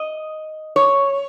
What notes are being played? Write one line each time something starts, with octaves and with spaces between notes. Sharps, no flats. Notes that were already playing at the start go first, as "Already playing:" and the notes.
Already playing: D#5
C#5